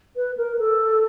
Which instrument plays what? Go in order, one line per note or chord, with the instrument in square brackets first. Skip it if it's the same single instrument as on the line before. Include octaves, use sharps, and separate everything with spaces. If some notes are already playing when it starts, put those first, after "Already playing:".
[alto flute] B4
A#4
A4